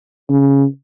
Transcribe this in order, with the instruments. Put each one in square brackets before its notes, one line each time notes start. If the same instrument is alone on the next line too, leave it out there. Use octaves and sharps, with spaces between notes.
[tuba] C#3